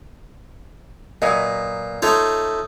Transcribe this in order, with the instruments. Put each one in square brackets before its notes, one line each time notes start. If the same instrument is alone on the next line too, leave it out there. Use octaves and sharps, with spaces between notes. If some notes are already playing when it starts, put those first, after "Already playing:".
[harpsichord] A#2 [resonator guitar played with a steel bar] F#3 B4 D#5
[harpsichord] A3 D#4 C#5 [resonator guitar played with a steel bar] F4